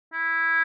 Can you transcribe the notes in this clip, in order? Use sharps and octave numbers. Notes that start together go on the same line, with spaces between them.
E4